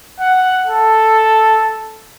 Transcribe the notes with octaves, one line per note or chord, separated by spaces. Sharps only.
F#5
A4